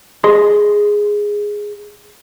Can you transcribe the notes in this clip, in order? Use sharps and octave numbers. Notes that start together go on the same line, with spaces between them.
G#4 D#5 C6